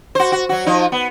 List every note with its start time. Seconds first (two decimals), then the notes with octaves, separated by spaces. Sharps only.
0.15 F#4 C5
0.32 F#4
0.49 F#3 F#4
0.66 F3 D#4
0.92 B3